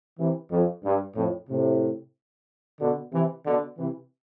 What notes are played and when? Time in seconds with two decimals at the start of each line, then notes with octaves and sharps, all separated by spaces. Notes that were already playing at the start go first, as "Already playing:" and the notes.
0.19 C3 E3
0.51 F2
0.84 G2
1.16 F2 A2
1.49 A2 C3
2.80 B2 D3
3.13 C3 E3
3.46 B2 D3
3.78 C3 E3